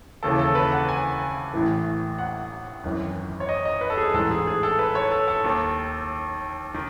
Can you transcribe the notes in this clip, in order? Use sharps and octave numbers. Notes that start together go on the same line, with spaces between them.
D#2 C#3 E3 A4
A4
B4
F#5
G#5
A1 A2 E3
F#5
G#1 F#2 E3
C#5
D#5
D#5
B4
A4
G#4
A1 G#2 E3 A4
G#4
G#4
A4
B4
C#5
A4
A4
D#2 D#3
D#3